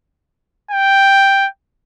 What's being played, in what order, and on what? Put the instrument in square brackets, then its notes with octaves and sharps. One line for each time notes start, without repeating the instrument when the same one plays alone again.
[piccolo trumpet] G5